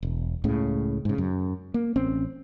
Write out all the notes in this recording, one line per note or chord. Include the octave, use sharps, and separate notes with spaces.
E1
C#2 A2 C#3
G#2 C#3
F#2
A#3
A1 C4 C#4